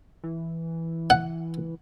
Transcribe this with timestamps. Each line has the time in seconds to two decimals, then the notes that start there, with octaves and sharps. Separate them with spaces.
0.24 E3
1.10 F#5